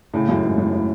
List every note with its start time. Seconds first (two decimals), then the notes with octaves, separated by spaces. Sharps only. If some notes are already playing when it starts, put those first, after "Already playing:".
0.14 A2 C#3
0.28 F#2 A2
0.43 G#2
0.58 F#2 A2
0.73 A2